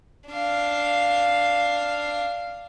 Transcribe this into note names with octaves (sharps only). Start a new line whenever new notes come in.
D4 F5